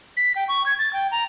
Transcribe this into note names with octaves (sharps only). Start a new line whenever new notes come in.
B6
G5
C#6
G#6
A6
G5
A#5